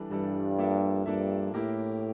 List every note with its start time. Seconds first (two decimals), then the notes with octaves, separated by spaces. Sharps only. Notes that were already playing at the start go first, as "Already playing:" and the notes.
Already playing: E3 G3 D4 A4
0.10 G2 E3 G3 D4 A4
0.59 F3 A#3 D4 A4 E5
1.06 G2 F3 A#3 D4 A4 E5
1.53 A2 A#3 E4 G4 A#4